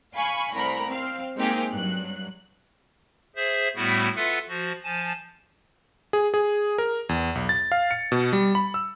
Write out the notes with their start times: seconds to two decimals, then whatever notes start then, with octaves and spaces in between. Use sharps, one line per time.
0.14 F5 G#5 B5 C#6
0.54 C2 A3 A#4 B5
0.87 C4 F5
1.36 G#3 A#3 C4 D#4 G4 G#4
1.72 G2 F#3 F#6
3.36 G#4 C5 E5
3.76 A2 G3 A3 B3 E4 F#4
4.16 F4 A4 B4 E5 F#5
4.49 F3 F#4
4.84 F3 G#5 A5
6.13 G#4
6.34 G#4
6.78 A#4
7.09 E2
7.35 B1
7.49 A6
7.72 F5
7.91 C#7
8.12 B2
8.33 G3
8.55 B5
8.74 E6